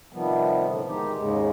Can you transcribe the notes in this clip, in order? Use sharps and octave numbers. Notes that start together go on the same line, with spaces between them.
C3 D#3 F3 G3 B3
A2 D3
D#3 G#3 D#4 G4
D#2 G#2 C#3 G#3